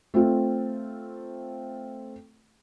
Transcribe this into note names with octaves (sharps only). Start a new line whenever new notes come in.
A3 C4 F4